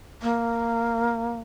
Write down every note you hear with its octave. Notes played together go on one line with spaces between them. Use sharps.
A#3